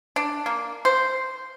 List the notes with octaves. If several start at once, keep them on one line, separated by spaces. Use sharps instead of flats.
D4
A#3
C5